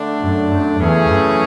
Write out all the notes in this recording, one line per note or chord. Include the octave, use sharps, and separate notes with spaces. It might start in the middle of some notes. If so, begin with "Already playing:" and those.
Already playing: D3 A3 D4
F#2
F#2
E2 C#3 E3 A3 C#4 G#4
F#2